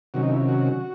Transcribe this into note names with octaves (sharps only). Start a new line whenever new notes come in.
C3 D#3 F#3 C#4 F#4
D#4
E4
F#4